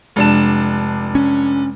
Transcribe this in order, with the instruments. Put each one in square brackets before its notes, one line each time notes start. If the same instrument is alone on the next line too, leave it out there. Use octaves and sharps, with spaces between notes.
[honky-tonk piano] F1 D4 E7 [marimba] G#3
[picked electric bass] C#4